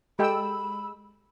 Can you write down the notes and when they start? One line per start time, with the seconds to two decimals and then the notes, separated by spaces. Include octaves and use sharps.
0.19 G#3 G4 A4 G5 B5 E6